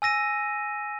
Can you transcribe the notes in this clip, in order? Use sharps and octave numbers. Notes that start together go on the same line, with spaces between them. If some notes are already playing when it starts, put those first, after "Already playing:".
G#5 E6 A#6 D#7